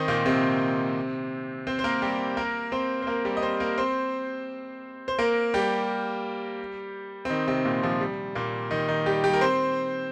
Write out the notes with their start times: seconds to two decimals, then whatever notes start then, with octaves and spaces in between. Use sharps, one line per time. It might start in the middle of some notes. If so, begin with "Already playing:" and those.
Already playing: D#3 C4 D#4 C5
0.08 A#2 A#3
0.26 C3 C4
1.67 C4 C5
1.79 C5
1.84 A#3 A#4
2.02 G3 G4
2.37 A#3 A#4
2.72 C4 C5
3.02 C5
3.07 A#3 A#4
3.25 G3 G4
3.37 D#5
3.43 C4 C5
3.60 A#3 A#4
3.78 C4 C5
5.08 C5
5.19 A#3 A#4
5.54 G3 G4
7.25 C4
7.30 D#3 D#4
7.48 C3 C4
7.65 A#2 A#3
7.83 F3
8.01 G3
8.35 A#2 A#3
8.71 D#3 D#4
8.88 D#3 D#4
9.06 G3 G4
9.24 G3 G4
9.33 A#4
9.41 C4 C5